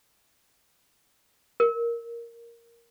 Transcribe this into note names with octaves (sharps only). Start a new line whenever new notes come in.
A#4